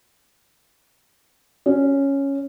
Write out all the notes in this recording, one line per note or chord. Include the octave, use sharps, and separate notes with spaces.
C#4